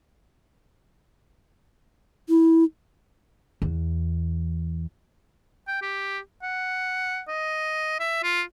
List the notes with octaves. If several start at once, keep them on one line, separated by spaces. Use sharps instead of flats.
E4
E2
G5
G4
F#5
D#5
E5
F4